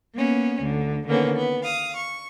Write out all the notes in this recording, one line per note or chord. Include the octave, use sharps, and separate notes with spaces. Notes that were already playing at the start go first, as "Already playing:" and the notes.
A#3 B3 C#4
D2 D3
D3 D#3 A#3 B3 C#4
B3
F5 D#6
C#6